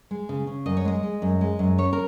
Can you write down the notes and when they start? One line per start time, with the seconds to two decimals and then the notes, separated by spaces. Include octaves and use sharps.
0.11 G#3
0.29 C#3
0.47 C#3
0.66 F#2 D#5
0.77 C#5
0.85 G#3 D#5
1.03 G#3
1.22 F#2
1.41 G#3
1.59 F#2
1.78 C#4 C#5
1.93 A#4